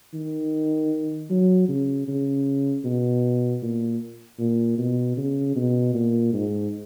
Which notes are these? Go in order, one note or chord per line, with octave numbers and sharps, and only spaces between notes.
D#3
F#3
C#3
C#3
B2
A#2
A#2
B2
C#3
B2
A#2
G#2